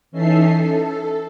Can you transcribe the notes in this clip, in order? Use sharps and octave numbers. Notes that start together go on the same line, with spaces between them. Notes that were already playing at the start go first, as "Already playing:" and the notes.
E3 C#4 D#4 A4 E5 C7
A4